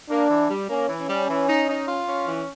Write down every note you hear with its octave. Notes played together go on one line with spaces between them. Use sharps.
A#3 D4
E3
G3
A#3 C#4
E3
C#4
G3
E3
D#4
D#4
F4
C#4
E3